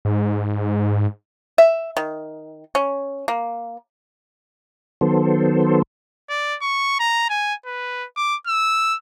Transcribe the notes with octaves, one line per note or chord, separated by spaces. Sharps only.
G#2
E5
D#3
C#4
A#3
D#3 F#3 B3 A4 C5
D5
C#6
A#5
G#5
B4
D6
E6